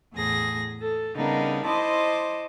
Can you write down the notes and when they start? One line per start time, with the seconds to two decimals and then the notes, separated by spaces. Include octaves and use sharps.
0.14 E2 A2 G#4 A#6
0.82 A4
1.16 C#3 G3 B3 D4 D#4 A#4
1.66 E4 C5 D#5 A5 C6 D6